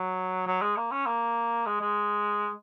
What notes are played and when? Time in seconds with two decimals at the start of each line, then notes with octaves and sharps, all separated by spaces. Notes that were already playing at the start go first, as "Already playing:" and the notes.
Already playing: F#3
0.47 F#3
0.62 G#3
0.77 A#3
0.92 C#4
1.07 A#3
1.66 G#3
1.81 G#3